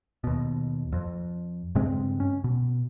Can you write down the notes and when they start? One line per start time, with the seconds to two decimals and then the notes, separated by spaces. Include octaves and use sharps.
0.24 D#2 B2
0.92 F2
1.75 G2 C#3 G#3 C4
2.20 C#4
2.44 B2